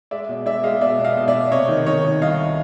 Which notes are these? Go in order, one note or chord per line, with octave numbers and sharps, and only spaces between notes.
G#3 D5 E5
B2
G#3 D5 E5
G#3 D#5 F5
B2 D5 E5
B2
D#5 F5
B2
D5 E5
B2
C3 C#5 D#5
D#3
D#3 C#5 D#5
D#3
C2 D#5 F5